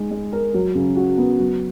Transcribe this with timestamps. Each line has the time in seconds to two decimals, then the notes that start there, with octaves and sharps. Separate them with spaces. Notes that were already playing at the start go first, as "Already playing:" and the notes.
Already playing: G#3 D#4
0.11 G#3
0.33 A#4
0.54 F#3
0.75 C#3
0.96 F#4
1.18 B3
1.39 F#3